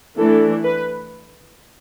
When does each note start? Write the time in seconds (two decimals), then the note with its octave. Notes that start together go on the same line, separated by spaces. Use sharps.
0.17 E3 A3 D4 A4
0.64 B4